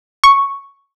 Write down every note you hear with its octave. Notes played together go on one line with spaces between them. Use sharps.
C#6